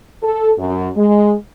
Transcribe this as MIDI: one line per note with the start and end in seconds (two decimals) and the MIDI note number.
0.23 0.52 69
0.59 0.89 42
0.97 1.35 56